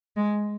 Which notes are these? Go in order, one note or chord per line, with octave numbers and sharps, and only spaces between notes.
G#3